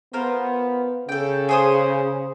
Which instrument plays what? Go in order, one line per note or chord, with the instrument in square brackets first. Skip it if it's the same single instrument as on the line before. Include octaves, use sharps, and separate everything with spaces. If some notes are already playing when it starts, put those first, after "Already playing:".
[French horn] B3 [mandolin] F4 A#4 C5
[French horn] C#3 [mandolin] A4 G5
[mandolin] G#4 C5 D#6